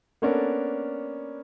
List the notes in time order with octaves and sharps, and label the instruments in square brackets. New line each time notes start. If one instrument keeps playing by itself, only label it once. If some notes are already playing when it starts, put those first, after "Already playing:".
[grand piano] A#3 B3 C#4 D4 A4 A#4